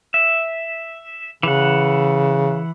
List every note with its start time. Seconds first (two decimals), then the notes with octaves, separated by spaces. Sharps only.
0.14 E5
1.43 C#3 E3 F#5